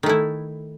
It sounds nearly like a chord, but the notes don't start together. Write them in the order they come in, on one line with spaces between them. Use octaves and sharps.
D#3 A3 E4